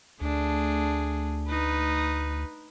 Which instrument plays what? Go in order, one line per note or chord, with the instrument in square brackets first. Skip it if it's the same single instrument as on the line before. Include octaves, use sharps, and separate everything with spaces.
[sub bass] D2 [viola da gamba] A3 D4 G#4
[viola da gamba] D#4 B4